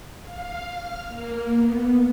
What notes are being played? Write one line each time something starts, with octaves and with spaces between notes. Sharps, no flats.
F5
F6
A#3
B3